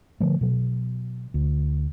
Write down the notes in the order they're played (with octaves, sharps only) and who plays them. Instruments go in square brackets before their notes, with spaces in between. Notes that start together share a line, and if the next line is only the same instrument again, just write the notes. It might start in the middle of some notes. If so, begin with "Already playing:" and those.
[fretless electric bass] D3 F3 A3
B2 F#3
D2